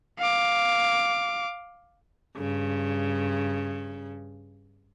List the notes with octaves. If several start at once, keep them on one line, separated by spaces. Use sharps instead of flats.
F5 D6
G2 C#3